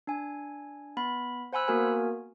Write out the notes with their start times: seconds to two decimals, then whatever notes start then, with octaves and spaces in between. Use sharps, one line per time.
0.07 D4 G#5
0.97 B3 B5
1.53 C5 F#5 G#5 B5 E6 F#6
1.68 A#3 B3 F#4 A#4 G#5